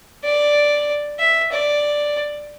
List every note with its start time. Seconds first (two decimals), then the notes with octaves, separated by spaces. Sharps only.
0.24 D5
1.19 E5
1.52 D5